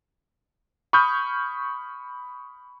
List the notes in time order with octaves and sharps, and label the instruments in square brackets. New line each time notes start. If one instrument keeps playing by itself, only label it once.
[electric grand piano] B5 C#6 D#6 F6 G6